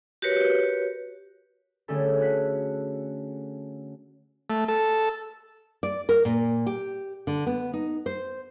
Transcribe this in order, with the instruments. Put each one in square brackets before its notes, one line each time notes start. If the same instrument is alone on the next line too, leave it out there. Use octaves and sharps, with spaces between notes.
[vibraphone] F#4 G4 A#4 B4 C#5
[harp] D3 G3 A3 C#4 G#4 A4
F#4 F#6 B6
[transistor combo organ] A3
A4
[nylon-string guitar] D5
A#4
A#2
G4
D3
B3
D#4
C5